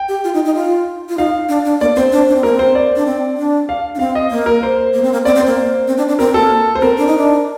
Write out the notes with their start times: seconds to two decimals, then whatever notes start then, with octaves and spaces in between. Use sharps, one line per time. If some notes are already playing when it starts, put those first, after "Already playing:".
Already playing: G5
0.09 G4
0.24 F4
0.34 D#4
0.45 D#4
0.56 F4
1.09 F4
1.17 D#4 F5
1.49 D4
1.65 D4
1.81 A#3 D5
1.96 C4 C5
2.12 D4
2.28 D4
2.36 C4
2.43 A#3 A#4
2.52 C4
2.59 C5
2.75 D5
2.96 D4
3.06 C4
3.38 D4
3.69 F5
3.95 D4
3.99 C4 F5
4.15 D#5
4.31 A#3
4.46 A#4
4.63 C5
4.94 A#3
5.03 C4
5.12 A#3
5.25 C4 D5
5.35 C4
5.40 C5
5.46 A#3
5.88 C4
5.97 D4
6.08 D4
6.19 C4 A#4
6.34 A#3 A4
6.75 C5
6.81 C4 A#4
6.98 D4
7.07 D#4
7.18 D4